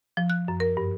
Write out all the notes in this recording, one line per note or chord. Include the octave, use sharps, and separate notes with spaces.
F3
F#6
F#2
A#4
G2